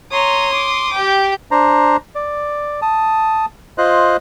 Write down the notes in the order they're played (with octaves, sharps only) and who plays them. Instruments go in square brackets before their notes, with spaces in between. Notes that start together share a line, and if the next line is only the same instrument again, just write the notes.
[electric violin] C#5 A#5 [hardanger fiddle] C6 D#6
[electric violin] D6
[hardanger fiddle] G4 G5
[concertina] D4 C5 A#5
D5
A5 D#6
F4 C5 D#5 F#6